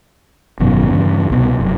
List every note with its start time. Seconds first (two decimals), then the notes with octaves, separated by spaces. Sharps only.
0.60 G#1 F#2 B2 D#3
0.89 E2 G2 C#3
1.30 C2 B2
1.59 F1 F#2